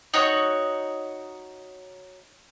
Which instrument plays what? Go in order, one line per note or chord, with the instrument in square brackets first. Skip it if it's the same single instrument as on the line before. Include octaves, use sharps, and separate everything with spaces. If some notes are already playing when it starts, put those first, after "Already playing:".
[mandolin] D#4 F#4 C#5